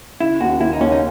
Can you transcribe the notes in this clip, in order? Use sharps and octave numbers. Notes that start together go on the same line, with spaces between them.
C#3 E4
D#2 F#4
D#2 E4
D#4
D#2 C#4
D#4